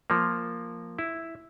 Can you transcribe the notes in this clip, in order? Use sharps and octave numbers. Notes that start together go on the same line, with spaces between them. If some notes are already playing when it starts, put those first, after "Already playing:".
F3 A#3
E4